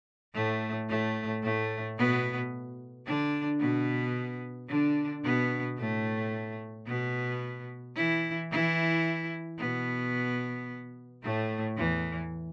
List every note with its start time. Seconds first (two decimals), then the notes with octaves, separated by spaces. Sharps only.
0.34 A2 A3
0.89 A2 A3
1.43 A2 A3
1.98 B2 B3
3.06 D3 D4
3.60 B2 B3
4.69 D3 D4
5.24 B2 B3
5.78 A2 A3
6.87 B2 B3
7.96 E3 E4
8.51 E3 E4
9.59 B2 B3
11.23 A2 A3
11.77 E2 E3